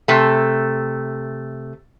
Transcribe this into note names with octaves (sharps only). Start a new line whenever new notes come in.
C3 A3